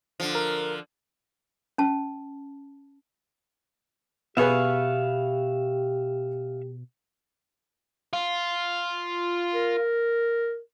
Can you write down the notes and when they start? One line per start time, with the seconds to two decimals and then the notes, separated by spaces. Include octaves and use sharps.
0.20 D3 F3
0.35 A#4
1.78 C#4 A5
4.37 B2 B3 G4 G#4 B4 E5 F5 C#6
8.13 F4
9.54 A#4